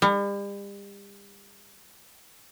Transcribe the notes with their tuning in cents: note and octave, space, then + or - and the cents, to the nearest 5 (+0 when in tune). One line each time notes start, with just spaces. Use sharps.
G3 +40